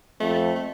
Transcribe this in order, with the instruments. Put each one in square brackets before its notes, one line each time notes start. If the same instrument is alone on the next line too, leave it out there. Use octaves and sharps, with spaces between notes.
[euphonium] F2 [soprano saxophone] A3
[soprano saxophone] A3